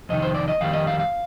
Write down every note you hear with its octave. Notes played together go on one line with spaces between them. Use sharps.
F2 C3 D#3 D#5
C5
D5
D#5
F2 D#3 G3 F5
D#5
F5
F5